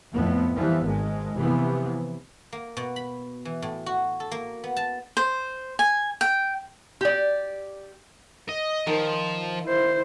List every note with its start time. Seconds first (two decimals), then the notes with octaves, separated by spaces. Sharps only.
0.13 F2 A2 F3 B3
0.55 E3 F3 G3 B3
0.84 G#1 G#2 G#3
1.36 C3 E3 F3 B3
2.53 A#3
2.77 B2
2.96 B5
3.45 E3
3.62 A2
3.86 F#4
4.20 A4
4.31 A#3
4.64 B3
4.77 A5
5.17 C5
5.79 G#5
6.21 G5
7.01 G4 D5
8.49 D#5
8.87 D#3 F3
9.66 E4 C5